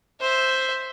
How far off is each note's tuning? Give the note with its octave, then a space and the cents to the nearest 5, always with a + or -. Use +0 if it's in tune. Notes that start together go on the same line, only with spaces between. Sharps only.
C5 +0 E5 +0